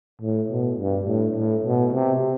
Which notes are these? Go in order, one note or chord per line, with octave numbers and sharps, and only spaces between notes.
A2
B2
G2
A2
A2
B2
C3